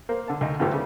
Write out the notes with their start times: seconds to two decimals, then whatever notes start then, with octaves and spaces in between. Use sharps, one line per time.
0.09 A#3 A#4 C5
0.28 D3 A5
0.41 D2 D#4
0.60 G2 D3 E3 F3 A3 G4
0.72 C#3 G3